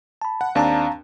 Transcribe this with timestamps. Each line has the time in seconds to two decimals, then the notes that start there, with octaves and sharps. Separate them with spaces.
0.22 A5 B5
0.41 F#5
0.55 D#2 C4 D4 F5 A5 A#5